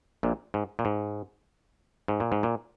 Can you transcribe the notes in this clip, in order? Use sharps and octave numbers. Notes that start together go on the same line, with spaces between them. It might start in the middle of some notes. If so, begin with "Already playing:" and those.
A#1 A#2
G#2
A#2
G#2
G#2
A#2
G#2
A#2